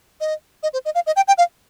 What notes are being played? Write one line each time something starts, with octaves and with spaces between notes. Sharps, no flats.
D#5
D#5
C5
D#5
F5
D#5
G5
G5
F5